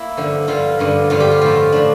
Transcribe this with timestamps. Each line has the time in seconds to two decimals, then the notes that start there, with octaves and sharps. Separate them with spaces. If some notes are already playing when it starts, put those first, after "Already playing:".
Already playing: A#3 E4
0.17 G2 D3 F3
0.48 G2 D3 F3 F4
0.79 G2 D3 F3
1.10 G2 D3 F3 F4
1.20 G4
1.31 F4
1.42 A2 F3 F4
1.72 A2 F3 D4